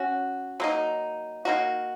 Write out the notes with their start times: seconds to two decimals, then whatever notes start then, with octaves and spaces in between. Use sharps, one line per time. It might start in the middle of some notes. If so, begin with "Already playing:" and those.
Already playing: C#4 F#4
0.60 F#3 A#3 D#4
1.45 A#3 D#4 F#4